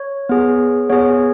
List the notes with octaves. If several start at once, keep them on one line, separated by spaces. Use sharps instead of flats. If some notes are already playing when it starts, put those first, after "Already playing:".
Already playing: C#5
B3 G#4
B3 G#4 C#5